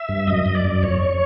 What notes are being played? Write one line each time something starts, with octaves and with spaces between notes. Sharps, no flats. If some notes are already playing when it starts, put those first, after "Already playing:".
Already playing: E5
G2
F#2 D#5
F#2
D5
F#2
F2 C#5